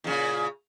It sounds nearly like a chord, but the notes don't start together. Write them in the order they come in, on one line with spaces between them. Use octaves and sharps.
E2 C#3 A#2